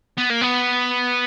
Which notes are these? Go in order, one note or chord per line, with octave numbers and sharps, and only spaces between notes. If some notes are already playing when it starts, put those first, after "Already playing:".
B3
A#3
B3